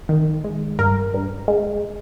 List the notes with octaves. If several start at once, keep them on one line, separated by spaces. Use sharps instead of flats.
D#3
G#3
G2 A#4
G2
G#3